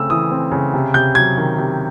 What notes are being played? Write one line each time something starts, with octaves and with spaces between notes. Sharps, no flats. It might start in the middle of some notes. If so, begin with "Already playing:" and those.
Already playing: C#3 A3 C4 E6
E3 D#6
C4
C#3
C3
C3 G6
F#3 G#6
D#3
C3